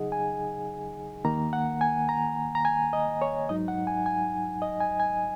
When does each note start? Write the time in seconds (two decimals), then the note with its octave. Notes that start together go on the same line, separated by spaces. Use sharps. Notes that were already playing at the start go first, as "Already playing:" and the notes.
Already playing: C#3 F#3 D#4 G#4 D#5 F#5
0.12 G#5
1.25 D#2 D#3 A#3 A#5
1.53 F#5
1.81 G#5
2.09 A#5
2.55 A#5
2.65 G#5
2.93 D#5
3.22 C#5
3.49 G#2 F#3 D#4 D#5
3.68 F#5
3.87 G#5
4.06 G#5
4.62 D#5
4.80 G#5
5.00 G#5